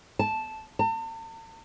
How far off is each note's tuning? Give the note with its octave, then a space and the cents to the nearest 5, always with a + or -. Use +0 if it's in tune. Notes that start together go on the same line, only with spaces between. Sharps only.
A5 -5
A5 +45